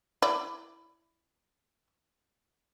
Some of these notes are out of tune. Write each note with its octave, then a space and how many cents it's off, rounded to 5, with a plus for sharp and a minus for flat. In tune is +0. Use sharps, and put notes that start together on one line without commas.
E4 +10 D5 +0